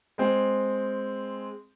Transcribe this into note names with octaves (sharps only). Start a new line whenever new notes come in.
G#3 C4